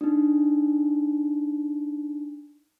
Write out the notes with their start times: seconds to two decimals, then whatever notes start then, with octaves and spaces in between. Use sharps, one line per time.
0.01 D4 D#4